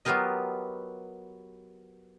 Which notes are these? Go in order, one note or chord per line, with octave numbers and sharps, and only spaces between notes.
F#3 B3 F4 G4 A#4 D#5